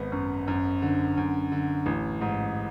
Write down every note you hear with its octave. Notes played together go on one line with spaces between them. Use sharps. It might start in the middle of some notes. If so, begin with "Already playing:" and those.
Already playing: G#1 B3
F#2
F#2
D3
F#2
D3
A1
G#2